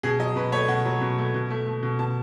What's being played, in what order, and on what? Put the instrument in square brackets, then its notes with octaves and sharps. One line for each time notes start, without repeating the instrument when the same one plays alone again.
[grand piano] B2 G#4
F#3 D#5
B2 B4
A3 C#5
B2 F#5
F#3
B2
A3
B2
A3
A3
B2
B2 A5